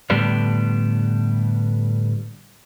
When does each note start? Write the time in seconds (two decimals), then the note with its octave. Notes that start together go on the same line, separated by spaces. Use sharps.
0.10 A2 D3 G3 B3 D4